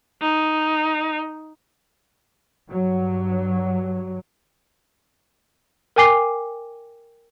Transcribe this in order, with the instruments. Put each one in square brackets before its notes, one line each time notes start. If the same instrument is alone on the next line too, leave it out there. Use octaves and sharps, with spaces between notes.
[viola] D#4
[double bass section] G2 F#3
[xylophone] A#4 G5 G#5 D6 C7 G7